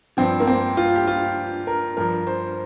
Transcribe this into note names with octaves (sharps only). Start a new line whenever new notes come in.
G2 F3 C4
A#3
C4
F4
G4
F4
A#4
G2 F3 A#4
C5